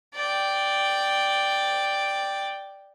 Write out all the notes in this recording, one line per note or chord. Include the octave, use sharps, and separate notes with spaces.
D5 G5